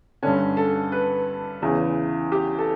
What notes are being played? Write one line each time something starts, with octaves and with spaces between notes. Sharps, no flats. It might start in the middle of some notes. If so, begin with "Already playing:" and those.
G2 D3 C#4
A4
B4
E2 C#3 E3
G4
A4